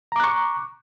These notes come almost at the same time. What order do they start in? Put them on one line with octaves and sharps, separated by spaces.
A#5 D6 F#6 C#6